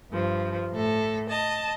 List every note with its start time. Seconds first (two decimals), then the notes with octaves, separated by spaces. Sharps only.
0.11 G2 F3
0.73 A2 A4
1.28 D#5 A5